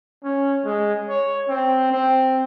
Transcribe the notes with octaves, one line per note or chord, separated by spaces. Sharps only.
C#4
G#3
C#5
C4
C4